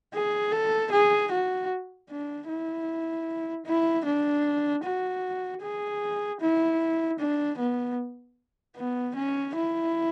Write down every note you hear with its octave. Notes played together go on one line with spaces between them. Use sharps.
G#4
A4
G#4
F#4
D4
E4
E4
D4
F#4
G#4
E4
D4
B3
B3
C#4
E4